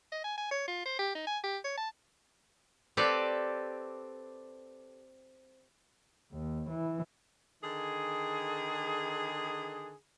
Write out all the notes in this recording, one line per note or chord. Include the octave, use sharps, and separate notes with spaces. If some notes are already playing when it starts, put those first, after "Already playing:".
D#5
G#5
G#5
C#5
F4
C5
G4
D#4
G#5
G4
C#5
A5
C4 G4 A4 B4 D5
D#2
E3
D3 D#3 G#4